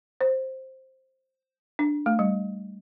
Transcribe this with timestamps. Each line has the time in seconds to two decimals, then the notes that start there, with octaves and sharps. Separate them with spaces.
0.21 C5
1.79 D4
2.06 A3
2.19 G3